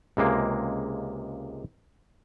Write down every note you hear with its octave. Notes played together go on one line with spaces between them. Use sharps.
C#2 C3 G#3 A#3